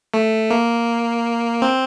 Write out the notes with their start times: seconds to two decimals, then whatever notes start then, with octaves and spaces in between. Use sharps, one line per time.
0.14 A3
0.51 A#3
1.62 C4